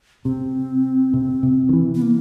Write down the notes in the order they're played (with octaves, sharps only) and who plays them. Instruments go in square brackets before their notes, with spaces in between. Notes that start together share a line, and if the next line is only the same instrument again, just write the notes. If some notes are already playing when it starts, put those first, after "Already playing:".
[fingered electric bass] C3 [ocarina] C4
[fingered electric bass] C3
C3
D#3
E3
[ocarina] B3
A#3